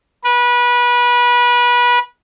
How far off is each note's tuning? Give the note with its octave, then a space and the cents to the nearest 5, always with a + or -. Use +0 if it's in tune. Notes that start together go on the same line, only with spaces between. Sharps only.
B4 -25